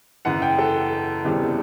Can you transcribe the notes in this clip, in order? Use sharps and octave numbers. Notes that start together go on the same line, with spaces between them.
F#1 F#2 E3 F#5
G5
A4
F#1 E2 C3 E3 G3